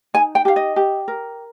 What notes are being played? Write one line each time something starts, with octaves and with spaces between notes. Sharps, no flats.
D#4 G#5
G5
G4 F5
D#5
G4
A#4